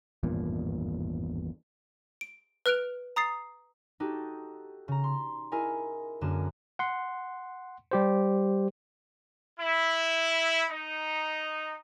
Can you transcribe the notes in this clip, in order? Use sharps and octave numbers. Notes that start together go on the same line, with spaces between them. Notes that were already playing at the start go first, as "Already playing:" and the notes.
G#1 E2 G2 A#2
D7
B4 F6 F#6 D7 F7
A#5 D#6 A6 C7
D#4 F#4 G4 A4
C#3 A#5
C6
E4 G#4 A#4 D#5 G#5
F#2 D3 A#3 G#4 E7
F#5 C6
G3 G4 C5
E4
D#4